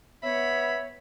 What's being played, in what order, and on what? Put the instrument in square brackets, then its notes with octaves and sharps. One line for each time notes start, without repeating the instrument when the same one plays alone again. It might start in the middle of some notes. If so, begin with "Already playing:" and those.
[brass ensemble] B3 [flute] C#5 [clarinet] E5 [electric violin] B5